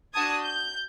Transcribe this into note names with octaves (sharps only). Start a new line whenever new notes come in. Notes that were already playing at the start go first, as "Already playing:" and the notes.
D4 F#4 A5 D#6 G#6
G6